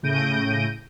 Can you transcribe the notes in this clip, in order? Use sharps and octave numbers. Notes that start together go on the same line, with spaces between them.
A2 C#3 G6 A#6 D7 D#7